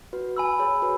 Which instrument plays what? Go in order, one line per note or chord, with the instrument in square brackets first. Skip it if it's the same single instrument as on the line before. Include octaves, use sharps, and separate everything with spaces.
[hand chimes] F#4 B4
[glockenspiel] G#5 B5 E6
[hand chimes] G#4 C#5
F#4 B4